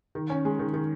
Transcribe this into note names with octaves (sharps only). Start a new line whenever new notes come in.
D#3
C#4
G#3
D#3
D#3